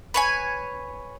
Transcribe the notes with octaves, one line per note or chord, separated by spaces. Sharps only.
B4 C#5 G#5